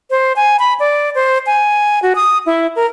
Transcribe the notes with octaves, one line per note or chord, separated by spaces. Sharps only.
C5
G#5
B5
D5
C5
G#5
F#4
D#6
E4
A#4